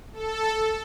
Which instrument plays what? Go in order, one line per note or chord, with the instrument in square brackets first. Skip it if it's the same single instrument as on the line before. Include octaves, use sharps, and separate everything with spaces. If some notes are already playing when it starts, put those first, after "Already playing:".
[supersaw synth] A4